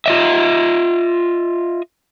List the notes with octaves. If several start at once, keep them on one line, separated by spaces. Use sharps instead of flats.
F4 D#5 E5